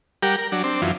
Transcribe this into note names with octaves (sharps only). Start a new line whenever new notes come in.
G3 G4 A#4 F#5
A#4
F#3 D4
C4 D4
F#2 E3 F3